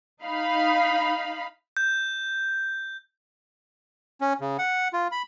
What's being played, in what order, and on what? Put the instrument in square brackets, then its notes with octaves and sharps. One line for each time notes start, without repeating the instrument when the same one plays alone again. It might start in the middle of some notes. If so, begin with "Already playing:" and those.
[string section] D#4 F5 B5
[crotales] G6
[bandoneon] C#4
C#3
F#5
F4
B5